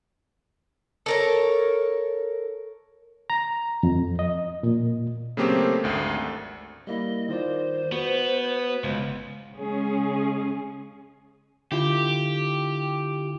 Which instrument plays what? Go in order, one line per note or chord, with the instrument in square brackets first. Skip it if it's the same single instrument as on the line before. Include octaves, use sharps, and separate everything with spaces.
[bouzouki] A4 A#4 C#5
[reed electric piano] A#5
F2
D#5
A#2
[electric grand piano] C#3 F#3 A3 A#3 C4 G4
G#1 D2
[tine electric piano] G3 A#3 E4 [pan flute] D#5
[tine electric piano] D#3 F4 D5 [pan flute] C5
[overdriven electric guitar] B3 [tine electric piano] F#4
[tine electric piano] G1 [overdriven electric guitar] C#2
[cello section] C#3 G#3 C#4 G#4
[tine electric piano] D3 E4 F4 [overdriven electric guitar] G4